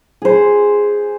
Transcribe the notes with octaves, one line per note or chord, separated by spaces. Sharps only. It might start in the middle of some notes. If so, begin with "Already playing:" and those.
G#4 C5